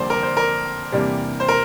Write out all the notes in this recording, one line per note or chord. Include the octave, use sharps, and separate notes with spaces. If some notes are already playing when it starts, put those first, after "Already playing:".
Already playing: F1 F2 D3 G3 A#3 C5 D5
A#4
C5
A#4
E2 C3 G3 A#3 D4
C5
A#4